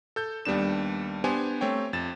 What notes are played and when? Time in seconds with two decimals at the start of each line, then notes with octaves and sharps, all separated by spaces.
0.16 A4 G6
0.45 D#2 G3 B3 D4 E7
1.24 B3 D4 G4 C5 G#5
1.61 A3 C4 C#5 G5
1.93 F2 A6 E7